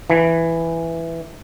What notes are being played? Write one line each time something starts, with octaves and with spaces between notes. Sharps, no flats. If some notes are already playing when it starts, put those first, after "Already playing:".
E3